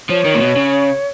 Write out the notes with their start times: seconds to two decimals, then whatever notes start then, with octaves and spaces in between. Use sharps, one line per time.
0.09 F3 C#5
0.25 D#3
0.34 A#2
0.41 B2
0.56 C#3